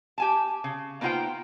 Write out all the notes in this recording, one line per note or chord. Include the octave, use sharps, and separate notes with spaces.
G4 G#5 A5
C#3
A#3 B3 D#4 F4 C5 G5